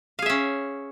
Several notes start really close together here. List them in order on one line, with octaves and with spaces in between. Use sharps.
F5 G#4 E5 C#4